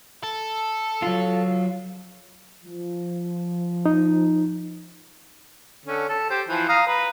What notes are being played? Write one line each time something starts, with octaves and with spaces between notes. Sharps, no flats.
A4
F#3 F4
F3
D#4
D3 C#4
A4
G4 C5
E3 F3 C5
F5 A#5 D#6
B4 A#5